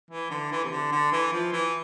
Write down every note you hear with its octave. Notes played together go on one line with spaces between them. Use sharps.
E3
D3
E3
C3
D3
D3
E3
F3
E3